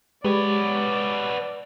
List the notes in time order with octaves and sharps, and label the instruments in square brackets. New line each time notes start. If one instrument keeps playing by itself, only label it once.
[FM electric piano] G#3 G4 [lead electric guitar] B3 C#5 [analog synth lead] B4 [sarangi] D5